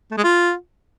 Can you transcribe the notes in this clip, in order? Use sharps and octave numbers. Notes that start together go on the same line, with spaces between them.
A3
G#3
F4